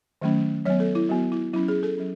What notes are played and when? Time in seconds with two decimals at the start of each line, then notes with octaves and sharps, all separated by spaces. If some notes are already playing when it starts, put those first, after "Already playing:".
0.22 D#3 F#3 A3 C#4
0.65 F#3 B3 C#5
0.80 A4
0.95 E4
1.09 F#3 B3 F#4
1.32 E4
1.53 F#3 C#4 E4
1.68 G#4
1.83 A4
1.98 F#3 C#4